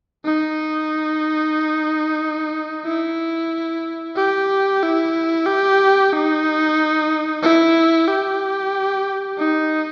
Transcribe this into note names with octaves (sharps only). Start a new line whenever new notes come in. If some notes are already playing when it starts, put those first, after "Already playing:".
D#4
E4
G4
E4
G4
D#4
E4
G4
D#4